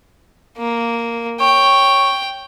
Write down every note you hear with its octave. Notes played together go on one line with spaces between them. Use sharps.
A#3
C#5 G5